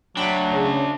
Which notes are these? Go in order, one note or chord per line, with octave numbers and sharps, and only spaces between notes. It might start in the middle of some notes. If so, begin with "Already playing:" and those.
F#3 D4 E5 G5 B5
C#3